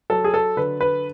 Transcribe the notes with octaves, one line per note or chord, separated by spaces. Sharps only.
F#3 A4
G#4
A4
D3 B4
B4